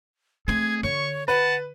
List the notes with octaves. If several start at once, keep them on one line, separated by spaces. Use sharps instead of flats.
A3 C4 G#4 G#6
D3 C#5 C#6
B4 F#5 A5